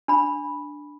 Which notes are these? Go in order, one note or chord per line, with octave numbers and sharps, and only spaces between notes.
D4 B5